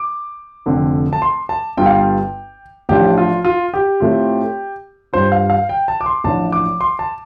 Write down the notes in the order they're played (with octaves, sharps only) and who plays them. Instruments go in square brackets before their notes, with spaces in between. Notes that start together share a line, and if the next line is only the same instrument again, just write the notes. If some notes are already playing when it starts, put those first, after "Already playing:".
Already playing: [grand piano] D6
F1 F2 D3 F3 C4
A5
C6
A5
G1 G2 G3 F4 G5
F5
G5
A1 A2 F3 D4 F4 G4
F4
F4
G4
A2 A3 C4 F4
G2 G3 D4 F4 C5
F5
F5
G5
A5
D6
C6
A1 A2 F3 D4 A5
D6
C6
A5